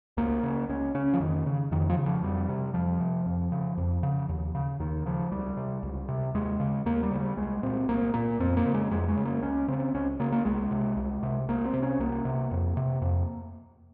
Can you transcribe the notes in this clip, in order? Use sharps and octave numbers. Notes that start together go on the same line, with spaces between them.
C#2 A#3
C#3
C#2 C#4
C#3 C#4
F3
F2 D#3
C#3
F2 D#3
F3
C#3
F3
F2 G3
C3
F2 F3
C3
F2
C#3
F2
C#3
D#2
C#3
D#2 D#3
C#3 F3
C#2 G3
C3
C#2
C3
D#2 G#3
C#3
D#2 A#3
G3
C#3
G3
C2 G#3
A#2 C4
C2 A#3
A#2 A#3
F2 C4
A#3
C#3
G#3
F2 G#3
G#3
C#3
A#3
C#2 C#4
C#3 C4
C#2 C#4
C#3 A#3
A#3
C2 G#3
C3
C2
C3
C2 A#3
C4
C3
C#4
C2 A#3
C3
F2
C3
F2